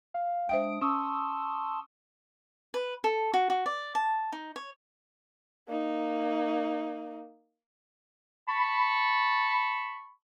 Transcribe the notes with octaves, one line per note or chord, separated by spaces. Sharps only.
F5
G#3 D4 C5 E5 G5 D#6 D7
C#4 A5 C6 C#6 D#6 E6
B4
A4
F#4
F#4
D5
A5
D#4
C#5
A#3 D#4
A5 B5 C#6